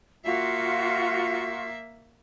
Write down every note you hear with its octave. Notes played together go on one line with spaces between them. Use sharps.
A#3 F4 F#4 E5